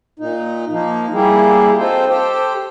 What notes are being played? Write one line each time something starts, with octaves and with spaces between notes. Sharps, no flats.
A#2 D#4
F3 A#3 D#4
G3 A#3 E4 G4 G#4
C4 D#4 F4 A4 C5
G4 A4 C5 G5